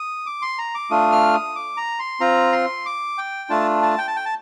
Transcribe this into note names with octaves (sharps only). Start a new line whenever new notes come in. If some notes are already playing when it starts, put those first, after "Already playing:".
Already playing: D#6
D6
C6
A#5
D6
A3 D4 F4 D#6
F6
D#6
D6
A#5
C6
C4 F4 A#5
C6
D6
G5
A3 D4 F4 A5
A5
G5
A5
G5
A5